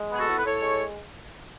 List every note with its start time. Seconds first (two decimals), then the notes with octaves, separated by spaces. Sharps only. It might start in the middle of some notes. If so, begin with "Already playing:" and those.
Already playing: G#3
0.11 B3 G#4
0.19 F#4 A4
0.28 A2
0.38 B4
0.45 A2 A4 C#5
0.62 G#3